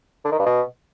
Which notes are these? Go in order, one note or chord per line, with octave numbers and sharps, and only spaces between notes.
D3
D#3
G2
B2